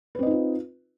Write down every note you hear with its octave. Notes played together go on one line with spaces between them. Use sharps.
C4 D#4 F4 B4 D#5